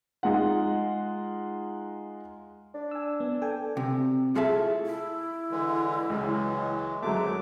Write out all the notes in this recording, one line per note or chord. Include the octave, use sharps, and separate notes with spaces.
G#3 D#4 F4 F#5
D4
G#5 E6
B3
A4 G5 G#5
C3
A2 F4 G#4 A4 E5 A5
E4
D3 E3 G#3
C#2 E3 F#3 G#3
F#2 F#3 G#3 A3 D6